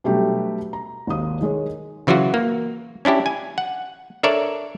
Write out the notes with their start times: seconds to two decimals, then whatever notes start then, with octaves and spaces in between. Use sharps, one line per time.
0.04 B2 F#3 G3 A3 D4 G4
0.73 A#5
1.07 G#1 D#2 D#6
1.41 D#3 G#3 G#4 C#5
2.07 C#3 E3 F#3 F4 F#4
2.34 A#3
3.05 C#4 D4 E4 G4
3.26 G#5
3.58 F#5
4.23 D4 A4 A#4 C#5 D5 E5